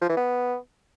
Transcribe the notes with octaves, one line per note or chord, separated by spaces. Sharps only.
F3
E3
B3